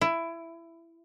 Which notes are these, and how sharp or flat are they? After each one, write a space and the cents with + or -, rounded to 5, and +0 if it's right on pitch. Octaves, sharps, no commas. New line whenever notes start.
E4 +15